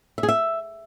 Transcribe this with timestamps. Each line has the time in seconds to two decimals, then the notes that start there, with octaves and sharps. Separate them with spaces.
0.18 E5
0.23 G#4
0.29 E5